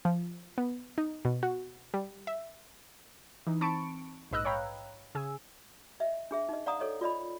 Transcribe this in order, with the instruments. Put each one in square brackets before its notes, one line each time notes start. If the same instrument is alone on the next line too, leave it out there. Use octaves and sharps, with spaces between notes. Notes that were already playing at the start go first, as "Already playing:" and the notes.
[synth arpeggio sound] F3
B3
D#4
B2
F#4
G3
E5
[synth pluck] E3 D#4
C4 A5 B5 C#6 C#7 D7
A#1 G#2 B4 D#5 E6 F#6
C#5 F5 G5 A#5 B5
C#3 G#4 G#5 E6
[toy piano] D#5 E5
D4 G#4 E5
D#4 D#5
D5 F5 F#5 A#5 D#6
A4 C#5 D#5
F4 D5 D#5 B5